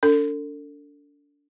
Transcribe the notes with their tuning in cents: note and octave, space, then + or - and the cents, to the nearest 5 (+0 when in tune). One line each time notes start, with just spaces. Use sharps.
D4 -30 A4 +35